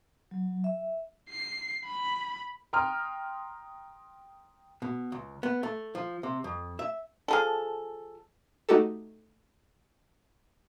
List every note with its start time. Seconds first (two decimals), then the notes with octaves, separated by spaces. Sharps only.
0.31 F#3
0.64 E5
1.30 C7
1.86 B5
2.73 G5 A#5 C6 D#6 F6
4.82 B2
5.12 C#2
5.43 B3
5.63 A3
5.95 F3
6.23 C3
6.44 F2
6.79 E5
7.28 F3 G#4 A4
8.69 A3 D#4 F#4 G4 A4